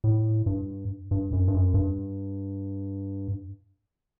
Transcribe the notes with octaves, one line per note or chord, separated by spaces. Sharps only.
A2
G2
G2
F#2
G2
F#2
G2